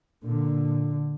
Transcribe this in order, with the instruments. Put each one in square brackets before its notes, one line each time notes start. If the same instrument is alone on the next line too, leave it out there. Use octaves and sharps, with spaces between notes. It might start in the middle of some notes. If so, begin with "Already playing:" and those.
[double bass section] A#2 D3